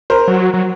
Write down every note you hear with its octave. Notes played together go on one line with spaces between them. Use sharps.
A#4 C5
F#3
F#3